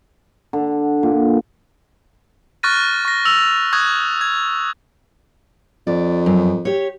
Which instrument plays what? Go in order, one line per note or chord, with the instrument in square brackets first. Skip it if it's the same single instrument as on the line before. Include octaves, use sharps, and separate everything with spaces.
[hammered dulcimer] D3
A#2
[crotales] C#6 F6 F#6 A6 A#6 D#7
C#6 A#6
E6 F7
C#6 D#6 F#6 G#6
G#6
[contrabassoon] F2 [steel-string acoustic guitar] D5
[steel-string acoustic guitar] F#2
G4 C#5